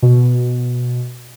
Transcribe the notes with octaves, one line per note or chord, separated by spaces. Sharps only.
B2